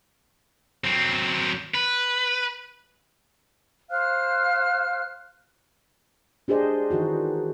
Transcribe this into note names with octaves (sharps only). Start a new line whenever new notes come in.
F#3 C4
B4
C5 F5 F6 F#6
D4 G4 G#4 C5 D#5
D#3 E3 D#4 F#4